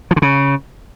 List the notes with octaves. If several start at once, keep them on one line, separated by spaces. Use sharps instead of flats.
F3
D3
C#3